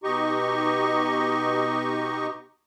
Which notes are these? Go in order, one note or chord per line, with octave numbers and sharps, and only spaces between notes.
B2 D#4 G4 D#5 C#6